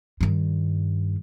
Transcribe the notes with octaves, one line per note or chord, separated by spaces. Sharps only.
G2 D#3